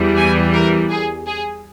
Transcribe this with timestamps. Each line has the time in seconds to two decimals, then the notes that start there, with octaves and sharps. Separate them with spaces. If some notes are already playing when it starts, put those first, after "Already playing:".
Already playing: E2 E3 G3
0.17 G#5
0.54 A#4
0.91 G#4
1.27 G#4